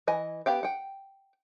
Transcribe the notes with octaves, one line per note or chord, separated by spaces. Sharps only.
E3 D#5 G#5
B3 G4 F5 G5
F#5 G5